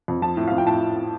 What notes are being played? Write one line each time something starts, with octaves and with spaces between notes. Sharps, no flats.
F2
F3 A5
A2
F3 F5
G5
A2 A5